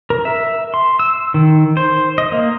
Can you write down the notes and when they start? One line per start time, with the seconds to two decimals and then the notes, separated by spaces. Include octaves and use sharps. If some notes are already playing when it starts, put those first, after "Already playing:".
0.10 A#4
0.25 E5
0.74 C6
0.99 E6
1.34 D#3
1.77 C5
2.18 D#5
2.32 A#3